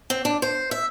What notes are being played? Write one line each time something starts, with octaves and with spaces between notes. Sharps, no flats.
C4
D4
C5
E5